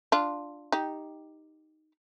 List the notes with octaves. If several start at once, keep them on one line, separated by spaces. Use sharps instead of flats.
D4 F4
D#4 G4